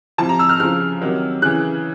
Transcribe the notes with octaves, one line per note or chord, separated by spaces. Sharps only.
C3 F3 A5
A#5
E6
F6
C#3 F3 F6
C3 D#3 F#3
C#3 E3 F#6